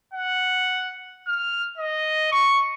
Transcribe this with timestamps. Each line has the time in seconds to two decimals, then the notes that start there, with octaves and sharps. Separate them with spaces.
0.13 F#5
1.27 F6
1.78 D#5
2.32 C#6